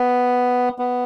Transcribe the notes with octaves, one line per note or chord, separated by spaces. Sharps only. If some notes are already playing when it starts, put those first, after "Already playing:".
Already playing: B3
B3